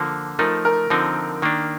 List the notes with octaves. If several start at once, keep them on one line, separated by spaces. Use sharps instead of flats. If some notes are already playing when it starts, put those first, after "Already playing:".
Already playing: D3 F3 A#3
F3 A3 D#4 A#4
A#4
D3 F3 C4 D#4
D#3 A#3 D4